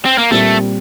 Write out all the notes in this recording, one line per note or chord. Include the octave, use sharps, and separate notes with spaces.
C4
A#3
A#2 G3 A3 C4